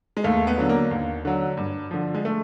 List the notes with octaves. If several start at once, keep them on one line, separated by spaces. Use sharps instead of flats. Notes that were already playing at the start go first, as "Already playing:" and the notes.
G#3
D#2 A3
B3
D3 F#3
A#3
D#2
D3 F#3
G2
D3 F3
G#3
A3